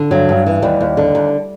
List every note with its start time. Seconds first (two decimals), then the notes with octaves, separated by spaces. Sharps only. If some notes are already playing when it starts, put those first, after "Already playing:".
Already playing: D3
0.11 G2 F#3
0.29 G2
0.46 E3
0.62 D#2 G3
0.81 D#2
0.97 D3
1.15 D#2